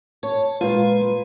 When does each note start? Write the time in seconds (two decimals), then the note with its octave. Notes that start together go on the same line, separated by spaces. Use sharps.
0.23 C#5 A5
0.61 A#2 G#3 F4 B4